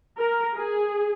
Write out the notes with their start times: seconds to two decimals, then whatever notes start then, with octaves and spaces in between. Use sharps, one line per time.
0.17 A#4
0.57 G#4